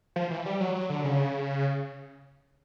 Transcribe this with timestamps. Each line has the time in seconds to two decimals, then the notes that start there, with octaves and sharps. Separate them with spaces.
0.16 F3
0.31 E3
0.45 G3
0.60 F#3
0.75 F#3
0.90 D3
1.04 C#3